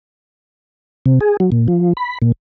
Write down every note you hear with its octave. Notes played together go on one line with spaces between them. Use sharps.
C3
G#4
F#3
A#2
F3
B5
A#2